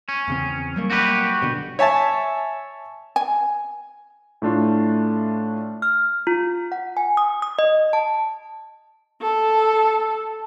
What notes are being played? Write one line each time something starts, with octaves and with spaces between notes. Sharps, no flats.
C#4
E2 C#3 C4
F#3 G3 A#3
F#4 G4 B4
G#1 B2 D3
C#5 E5 G#5 A5
G#5
A2 A3 D4 F4
F6
F4
F#5
G#5
D#6
D#6
D#5
A5
A4